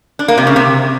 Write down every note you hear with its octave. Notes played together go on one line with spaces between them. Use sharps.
D4
A#3
C3
C#3
C3